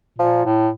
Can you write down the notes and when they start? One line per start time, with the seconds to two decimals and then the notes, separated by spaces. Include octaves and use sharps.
0.19 A#2 F3
0.45 A2